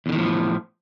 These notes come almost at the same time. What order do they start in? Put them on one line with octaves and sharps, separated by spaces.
E2 D3 D#3 A2 F3